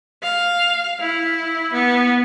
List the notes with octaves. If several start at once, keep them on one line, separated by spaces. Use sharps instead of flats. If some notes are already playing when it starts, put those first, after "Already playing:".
F5
E4
B3